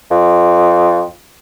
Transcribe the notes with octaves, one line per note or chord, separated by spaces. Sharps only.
F2